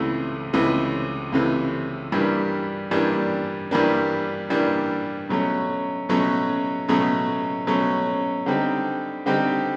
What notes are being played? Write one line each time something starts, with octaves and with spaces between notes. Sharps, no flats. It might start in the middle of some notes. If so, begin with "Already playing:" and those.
Already playing: C#2 C3 E3 A3
C#2 C3 E3 A3
C#2 C3 E3 A3
G2 E3 G3 A#3 D4
G2 E3 G3 A#3 D4
G2 E3 G3 A#3 D4
G2 E3 G3 A#3 D4
B2 F#3 A3 C#4
B2 F#3 A3 C#4
B2 F#3 A3 C#4
B2 F#3 A3 C#4
D3 G3 C4 D#4 G4
D3 G3 C4 D#4 G4